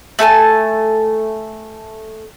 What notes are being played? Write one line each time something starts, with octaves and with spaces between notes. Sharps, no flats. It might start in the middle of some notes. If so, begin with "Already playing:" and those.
A3 A4 G#5 A5